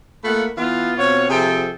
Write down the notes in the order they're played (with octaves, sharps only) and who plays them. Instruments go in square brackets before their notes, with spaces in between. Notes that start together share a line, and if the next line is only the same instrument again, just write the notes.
[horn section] A3 A#3 F4 F#5 B5
E3 B3 F4
B2 C4 F4 C#5
C3 F3 G#4 A4 G5